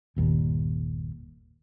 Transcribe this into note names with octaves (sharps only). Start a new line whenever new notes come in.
G1 D#2 A#2